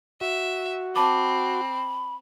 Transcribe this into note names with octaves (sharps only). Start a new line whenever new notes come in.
F#4 E5
C4 A5 B5 D6